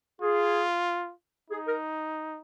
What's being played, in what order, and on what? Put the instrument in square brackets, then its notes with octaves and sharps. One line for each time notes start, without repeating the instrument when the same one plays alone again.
[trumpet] F4 [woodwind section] G#4
[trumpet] D#4 [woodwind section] G#4
[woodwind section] A#4